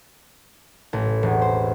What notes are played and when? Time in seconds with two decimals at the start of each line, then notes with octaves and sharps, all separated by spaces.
0.93 A1
1.23 E1
1.42 C5